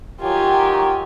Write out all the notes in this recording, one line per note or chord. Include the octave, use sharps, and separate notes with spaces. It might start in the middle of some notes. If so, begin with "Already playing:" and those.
D#3 F#3 F4 G4 G#5